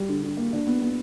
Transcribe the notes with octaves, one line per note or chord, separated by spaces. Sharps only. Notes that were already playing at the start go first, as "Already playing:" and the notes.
Already playing: G3
D3
D3
A#3
D4
B3
B3